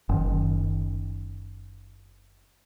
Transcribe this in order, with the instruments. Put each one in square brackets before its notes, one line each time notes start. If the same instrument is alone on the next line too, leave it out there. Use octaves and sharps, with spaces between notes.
[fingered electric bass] F#1 D#3